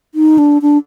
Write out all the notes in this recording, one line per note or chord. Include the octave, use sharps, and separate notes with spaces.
D#4
D4
D4